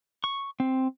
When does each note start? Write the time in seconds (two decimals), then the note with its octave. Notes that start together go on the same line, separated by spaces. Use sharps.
0.24 C#6
0.60 C4